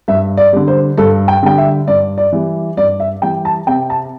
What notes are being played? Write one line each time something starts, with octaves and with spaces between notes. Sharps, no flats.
G2 E5
D5
D3 G3
C5
G2 A4
G5
D3 G3 G5
E5
G2 D5
D5
E3 G3
G2 D5
E5
E3 G3 G5
A5
C3 G5
A5